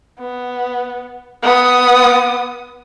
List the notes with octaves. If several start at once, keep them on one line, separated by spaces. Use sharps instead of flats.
B3
B3 D#6